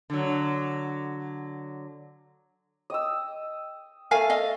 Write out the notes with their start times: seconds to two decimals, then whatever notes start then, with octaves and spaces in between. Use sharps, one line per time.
0.10 D3 F#3
2.90 D#5 G5 E6
4.11 A3 A#4 F5 G#5 A5
4.30 D#5 F5